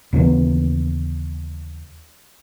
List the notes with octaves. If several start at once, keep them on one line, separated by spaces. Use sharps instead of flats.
D#2 C#3 E3 B3